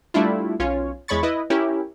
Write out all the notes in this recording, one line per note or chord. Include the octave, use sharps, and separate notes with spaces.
G3 A3 D4 E4 F4
B1 C#4 F4 C#5
E2 G#3 C#5 B5 C#6 A6
E4 B4 D#5
C#4 E4 G4 A#4